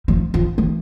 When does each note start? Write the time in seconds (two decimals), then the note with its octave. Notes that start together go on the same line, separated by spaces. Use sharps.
0.08 F3
0.34 F3
0.58 E3